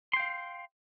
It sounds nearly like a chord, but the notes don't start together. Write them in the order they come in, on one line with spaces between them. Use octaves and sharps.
C6 G5 F5